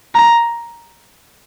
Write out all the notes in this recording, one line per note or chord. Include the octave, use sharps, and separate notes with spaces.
A#5